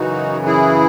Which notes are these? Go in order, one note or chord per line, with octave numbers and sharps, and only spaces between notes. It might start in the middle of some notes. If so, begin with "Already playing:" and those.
Already playing: F#2 C#3 E3 D#4 F#4
E4 G#4